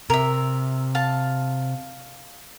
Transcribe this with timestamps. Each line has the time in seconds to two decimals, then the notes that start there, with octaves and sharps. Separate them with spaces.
0.10 C3 A#4 E5
0.95 F5 A5